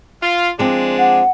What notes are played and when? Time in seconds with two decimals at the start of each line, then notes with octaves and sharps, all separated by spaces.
0.22 F4
0.59 F3 G#3 C4 D4
0.99 F#5